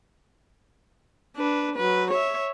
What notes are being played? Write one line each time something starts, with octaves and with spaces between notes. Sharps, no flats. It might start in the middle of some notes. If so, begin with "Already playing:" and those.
D4 B4
F#3 B4
C#5 E5